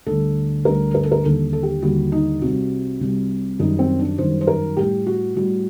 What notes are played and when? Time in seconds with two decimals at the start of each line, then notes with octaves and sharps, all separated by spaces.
0.06 D2 D3 G3 A4
0.65 D2 D3 G3 A#4
0.95 A#4
1.04 A4
1.12 A#4
1.24 D#2 D3 G3 A4
1.53 A4
1.63 G4
1.82 D#2 D3 G3 F#4
2.12 D#4
2.41 C2 C3 G3 F#4
3.00 C2 C3 G3
3.59 F#2 D#3 G3 D#4
3.79 C4
3.99 D4
4.18 F#2 D#3 G3 C5
4.41 C5
4.47 A#4
4.77 A2 G3 G4
5.07 F#4
5.36 A2 G3 F#4